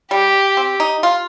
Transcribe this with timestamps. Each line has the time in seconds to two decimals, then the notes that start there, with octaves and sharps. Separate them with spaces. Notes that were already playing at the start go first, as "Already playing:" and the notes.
0.11 G3 G4
0.57 C4
0.80 D#4
1.03 F4